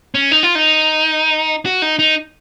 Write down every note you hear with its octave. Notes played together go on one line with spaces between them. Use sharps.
C#4
D#4
F4
D#4
F#4
D#4
D#4